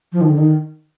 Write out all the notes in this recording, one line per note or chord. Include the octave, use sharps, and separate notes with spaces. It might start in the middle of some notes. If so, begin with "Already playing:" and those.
F3
D#3
D3
D#3